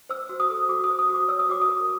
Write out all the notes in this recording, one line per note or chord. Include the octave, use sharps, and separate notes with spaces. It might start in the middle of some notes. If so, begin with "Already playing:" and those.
C5 E6
F#4
D#6
A4
F#4 D6
D#6
C5
D#6
F#4
D6
C#5 E6
D#6
F#4 D6
D#6
A#4